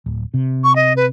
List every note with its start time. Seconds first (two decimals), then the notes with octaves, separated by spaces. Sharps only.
0.06 D1
0.34 C3
0.64 C#6
0.76 D#5
0.96 B4